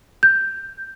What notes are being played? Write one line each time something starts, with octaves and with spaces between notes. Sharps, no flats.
G6